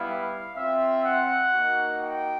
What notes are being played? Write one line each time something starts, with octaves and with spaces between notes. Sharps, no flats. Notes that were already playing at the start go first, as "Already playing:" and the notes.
Already playing: G3 B3 E4 F5
C4 F4 E5
F#5
A#3 D#4 F#4
G5